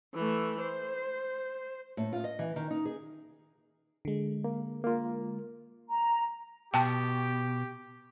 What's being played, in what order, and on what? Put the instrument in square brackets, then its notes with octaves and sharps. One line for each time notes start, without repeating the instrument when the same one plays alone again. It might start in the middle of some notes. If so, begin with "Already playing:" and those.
[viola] E3 A3
C5
[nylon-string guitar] A2
F4
D#5
E3
D#3
D#4
G#4
[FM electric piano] D3 G#3
[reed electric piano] A#3
A#3 F4
[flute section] A#5
[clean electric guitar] B2 [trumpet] G4 [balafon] G5 A5